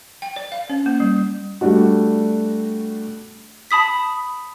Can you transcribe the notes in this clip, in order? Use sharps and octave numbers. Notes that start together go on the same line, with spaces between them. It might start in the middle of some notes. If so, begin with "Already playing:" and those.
G5
D5
F5
C#4
A#3
G3
G3 A3 D4 F#4
A5 B5 D#6 B6